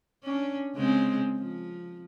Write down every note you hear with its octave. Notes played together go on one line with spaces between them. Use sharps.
C#4 D4
C#3 G#3 C4
F3